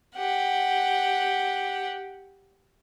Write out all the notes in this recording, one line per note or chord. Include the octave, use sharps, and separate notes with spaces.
G4 F#5